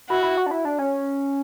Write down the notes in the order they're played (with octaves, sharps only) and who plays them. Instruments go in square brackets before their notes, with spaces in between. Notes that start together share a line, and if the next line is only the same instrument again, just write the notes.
[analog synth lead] E4 [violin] F#4
[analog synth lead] E4
F#4
D4
E4
D4
C#4